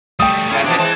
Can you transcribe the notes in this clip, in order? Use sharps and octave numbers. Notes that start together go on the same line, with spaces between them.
G3 A3 G5 D#6
A2 C#3 C#4 F4
B2 E3 F3 D4
E3 G#3 C4 A5